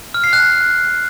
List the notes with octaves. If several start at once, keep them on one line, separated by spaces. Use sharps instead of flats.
F6
C7
F#6